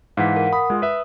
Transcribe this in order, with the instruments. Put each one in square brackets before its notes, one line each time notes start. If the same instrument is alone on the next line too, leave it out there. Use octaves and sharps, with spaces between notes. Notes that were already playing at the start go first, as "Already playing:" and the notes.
[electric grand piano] G#2 E3 [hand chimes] F5 F#5 B6
[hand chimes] A#4 F#5
[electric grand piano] B5 [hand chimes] D#6
[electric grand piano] G#3 F4
B4 E5